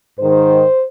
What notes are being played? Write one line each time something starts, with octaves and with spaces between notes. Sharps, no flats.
G#2 D#3 C5